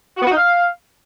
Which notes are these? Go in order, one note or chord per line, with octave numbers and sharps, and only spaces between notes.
F#4
B3
F#4
D#4
F5